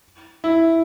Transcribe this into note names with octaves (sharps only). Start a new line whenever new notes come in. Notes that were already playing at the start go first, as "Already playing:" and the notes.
E4